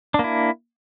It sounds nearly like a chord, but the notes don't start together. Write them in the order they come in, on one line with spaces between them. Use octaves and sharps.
D4 A#3 E4